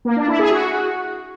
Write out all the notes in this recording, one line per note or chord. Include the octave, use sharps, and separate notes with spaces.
A#3
D4
E4
G#4
F#4